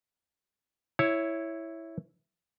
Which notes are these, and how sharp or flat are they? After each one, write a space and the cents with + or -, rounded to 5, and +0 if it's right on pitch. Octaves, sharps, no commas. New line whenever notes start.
E4 +0 C#5 +0